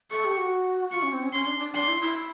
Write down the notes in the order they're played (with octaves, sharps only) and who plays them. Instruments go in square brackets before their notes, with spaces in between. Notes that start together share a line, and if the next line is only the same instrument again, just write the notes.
[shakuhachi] A4 [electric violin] C#6
[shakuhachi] G4
F#4
[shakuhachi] F4 [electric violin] C#6
[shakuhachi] C#4
C4
C#4
[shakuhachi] C#4 [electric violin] C6
[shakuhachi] D4
D4
[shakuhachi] D4 [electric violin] C6
[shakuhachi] E4
E4